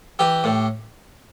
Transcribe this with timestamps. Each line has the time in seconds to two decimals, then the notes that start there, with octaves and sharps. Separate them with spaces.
0.19 E3 G4
0.44 A2